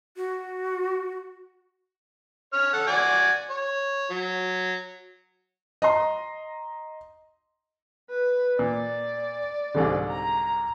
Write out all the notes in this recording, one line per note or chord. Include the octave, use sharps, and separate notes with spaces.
F#4
C#5 F6
A4 F#5
F#4 D5 G#5
C#5
F#3
D#5 A#5 C6
B4
A#2 D5
C2 G#2 D3
A#5